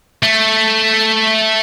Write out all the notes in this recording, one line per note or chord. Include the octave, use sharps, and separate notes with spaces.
A3